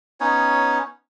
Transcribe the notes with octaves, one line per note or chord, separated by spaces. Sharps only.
B3 C#4 D#4 C#5